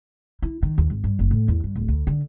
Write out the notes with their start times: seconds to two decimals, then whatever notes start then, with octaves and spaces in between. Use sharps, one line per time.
0.42 E4
0.63 D#3
0.78 D#2
0.90 G#1
1.04 G2
1.19 F#1
1.31 A2
1.48 E2
1.64 G2
1.76 D1
1.88 D2
2.07 D3